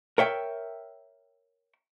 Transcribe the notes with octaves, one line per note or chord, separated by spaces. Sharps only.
A#4 C#5 E5 G5